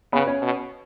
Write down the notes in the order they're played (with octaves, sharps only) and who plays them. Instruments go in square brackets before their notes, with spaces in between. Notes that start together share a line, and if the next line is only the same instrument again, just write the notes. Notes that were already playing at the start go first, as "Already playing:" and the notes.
[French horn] C#3 [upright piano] B3 B4
[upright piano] C#4 C#5
[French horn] B2